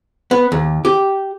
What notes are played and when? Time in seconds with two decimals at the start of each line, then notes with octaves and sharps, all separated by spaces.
0.31 B3
0.52 D#2
0.85 G4